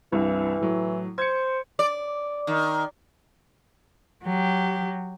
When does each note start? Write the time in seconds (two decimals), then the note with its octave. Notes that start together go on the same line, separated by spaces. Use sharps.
0.12 C2 G2 E3
0.61 A2 F#3
1.18 C5 G#6 C#7
1.79 D5
2.47 D#3
4.24 F#3 G4